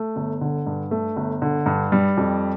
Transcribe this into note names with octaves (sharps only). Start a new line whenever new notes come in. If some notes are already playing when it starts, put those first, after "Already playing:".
Already playing: A3
G1
D3
G2
A3
G1
D3
G2
G3
F2